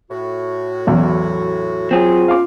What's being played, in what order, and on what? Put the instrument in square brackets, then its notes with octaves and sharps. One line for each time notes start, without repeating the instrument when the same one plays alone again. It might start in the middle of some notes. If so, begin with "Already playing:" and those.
[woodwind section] A2 F#4
[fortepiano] B1 E2
[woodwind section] F#3 [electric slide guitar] C4 G#4 [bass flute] F4
[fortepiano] F5 D6